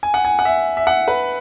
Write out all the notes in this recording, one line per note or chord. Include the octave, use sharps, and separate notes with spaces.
G#5
F#5
G#5
F#5
E5
E5
F#5
B4